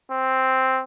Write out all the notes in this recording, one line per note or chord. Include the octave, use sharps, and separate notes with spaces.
C4